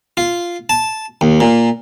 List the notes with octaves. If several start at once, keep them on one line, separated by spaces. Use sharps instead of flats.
F4
A5
D#2
A#2